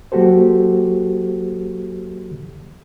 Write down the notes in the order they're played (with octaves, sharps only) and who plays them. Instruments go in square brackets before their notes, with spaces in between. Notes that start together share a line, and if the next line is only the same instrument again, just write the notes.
[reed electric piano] F#3 A#3 F#4 G4 A4 C5